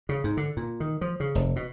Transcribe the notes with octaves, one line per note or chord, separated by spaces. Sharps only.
C#3
G#2
D3
A#2
D#3
F3
C#3
F1
B2